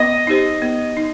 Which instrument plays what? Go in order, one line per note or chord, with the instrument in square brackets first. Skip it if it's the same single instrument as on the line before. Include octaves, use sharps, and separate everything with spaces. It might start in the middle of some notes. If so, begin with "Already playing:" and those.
Already playing: [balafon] B3 [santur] D#5
[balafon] D#4 G4 C5
B3
D#4